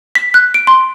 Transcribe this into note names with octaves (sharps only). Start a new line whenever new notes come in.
B6
F#6
D7
C6